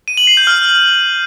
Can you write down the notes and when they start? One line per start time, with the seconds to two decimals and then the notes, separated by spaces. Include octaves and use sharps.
0.08 D#7
0.17 F#7
0.27 C7
0.37 G6
0.47 F6